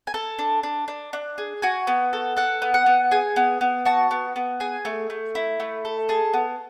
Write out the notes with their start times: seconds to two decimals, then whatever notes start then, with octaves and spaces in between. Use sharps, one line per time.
0.07 G#5
0.14 A4 A5
0.39 D4
0.63 D4
0.88 D4
1.13 D4
1.38 G#4
1.62 F#4 G#5
1.87 B3
2.13 A4
2.37 A4 F#5
2.62 B3
2.74 F#5
2.86 B3
3.11 G#4 G#5
3.36 B3
3.61 B3
3.85 F#4 A5
4.11 B3
4.36 B3
4.60 G#4 G#5
4.85 A3
5.10 A3
5.35 E4
5.60 A3
5.85 A4
6.09 G#4 A5
6.34 B3